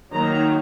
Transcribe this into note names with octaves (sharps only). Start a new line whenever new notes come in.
D#3 F#3 A#3 D#4 A#5